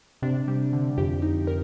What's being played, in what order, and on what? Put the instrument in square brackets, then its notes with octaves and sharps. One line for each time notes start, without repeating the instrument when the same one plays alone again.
[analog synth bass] C3 [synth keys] D4
[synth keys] G3
D3
[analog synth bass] F2 [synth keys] G4
[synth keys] D#4
A#4